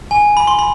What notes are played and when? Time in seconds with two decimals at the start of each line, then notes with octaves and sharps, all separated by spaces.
0.11 G#5
0.37 B5
0.47 C6
0.59 B5